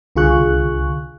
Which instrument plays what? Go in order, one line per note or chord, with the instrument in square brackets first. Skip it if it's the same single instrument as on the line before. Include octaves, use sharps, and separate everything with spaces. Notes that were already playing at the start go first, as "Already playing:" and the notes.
[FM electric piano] C2 D3 F4 G#4 C#6 F#6